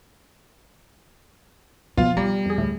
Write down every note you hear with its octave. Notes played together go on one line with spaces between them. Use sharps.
B2 F3 B3 F4 F5
G3 B3 D5 A#5
F2 G#4
D2 A2